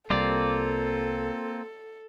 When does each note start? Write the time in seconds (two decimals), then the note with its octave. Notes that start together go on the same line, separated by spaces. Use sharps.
0.10 C2 G3 A#3 C4 F4 A4 D5